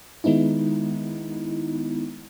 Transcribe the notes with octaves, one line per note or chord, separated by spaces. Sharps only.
D#3 G#3 B3 D#4 E4